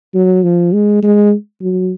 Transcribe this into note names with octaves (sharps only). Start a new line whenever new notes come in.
F#3
F3
G#3
G#3
F#3